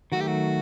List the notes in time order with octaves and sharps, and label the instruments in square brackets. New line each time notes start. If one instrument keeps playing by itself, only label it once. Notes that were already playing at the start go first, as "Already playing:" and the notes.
[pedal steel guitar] D#3 F#3 A3 [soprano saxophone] F#4
[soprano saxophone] G4
F#4